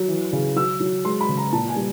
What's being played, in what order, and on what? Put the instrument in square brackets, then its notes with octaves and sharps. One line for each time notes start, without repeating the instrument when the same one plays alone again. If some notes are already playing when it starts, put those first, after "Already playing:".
Already playing: [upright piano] F#3
E3
C#3
F#3 E6
F#3
G#3 C6
B5
C#3
A#5
A#2 A5
G#5
G3